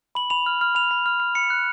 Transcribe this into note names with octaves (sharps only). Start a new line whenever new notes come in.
B5 F#7
B5 F7
F6
F6
B5 F7
B5
F6
F6
B5 C#7
F#6